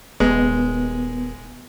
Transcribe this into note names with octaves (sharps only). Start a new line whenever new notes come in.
D#1 G#3 B3